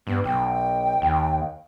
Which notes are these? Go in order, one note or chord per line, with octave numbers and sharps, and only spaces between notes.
G2 B3
B1 G5
D#2